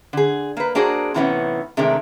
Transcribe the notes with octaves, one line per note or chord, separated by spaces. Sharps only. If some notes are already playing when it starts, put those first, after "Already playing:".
D3 G#4
A#3 B4
A#3 D4 F#4 G#4 C5
A2 C3 E3 B3 C#4 D#4
C3 D#3 G#3 A3 D4